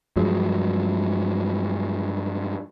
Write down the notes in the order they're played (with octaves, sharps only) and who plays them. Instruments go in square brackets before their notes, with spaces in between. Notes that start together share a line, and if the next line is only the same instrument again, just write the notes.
[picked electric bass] G2 F3 F#3 G#3